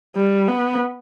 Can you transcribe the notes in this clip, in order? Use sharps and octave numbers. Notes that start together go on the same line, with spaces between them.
G3
B3